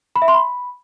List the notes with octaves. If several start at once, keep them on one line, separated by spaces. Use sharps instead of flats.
B5
E5
C6
B5